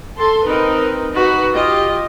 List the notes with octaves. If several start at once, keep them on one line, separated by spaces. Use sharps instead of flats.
A4 C6
C4 D#4 A#4 B4
D#4 F#4 B4
F4 G4 D#5